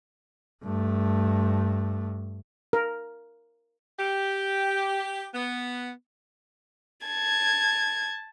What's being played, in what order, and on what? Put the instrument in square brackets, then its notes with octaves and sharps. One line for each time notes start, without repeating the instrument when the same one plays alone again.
[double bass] G2 A3
[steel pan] A#4
[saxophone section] G4
B3
[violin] A5 G#6